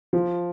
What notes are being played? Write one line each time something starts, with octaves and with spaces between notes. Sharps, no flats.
F3